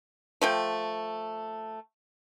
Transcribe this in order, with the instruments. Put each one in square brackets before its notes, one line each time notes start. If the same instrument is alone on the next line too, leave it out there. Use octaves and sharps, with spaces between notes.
[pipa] F3 A3 G5